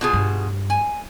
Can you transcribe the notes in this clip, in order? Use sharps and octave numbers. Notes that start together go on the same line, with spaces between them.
B2 F4 G#4
G2
G#5